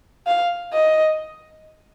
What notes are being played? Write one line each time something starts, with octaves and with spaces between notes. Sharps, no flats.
F5
D#5